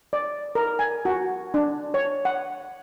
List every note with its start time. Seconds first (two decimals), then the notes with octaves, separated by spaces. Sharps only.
0.13 D5
0.55 A#4
0.79 G#5
1.05 F#4
1.54 D4
1.94 C#5
2.25 F#5